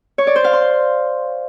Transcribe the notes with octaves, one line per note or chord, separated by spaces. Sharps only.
C#5
D5
C5
F5
C6